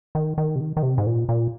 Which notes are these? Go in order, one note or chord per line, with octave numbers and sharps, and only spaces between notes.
D#3
D#3
C3
D#3
D#3
C3
G#2
A#2
A#2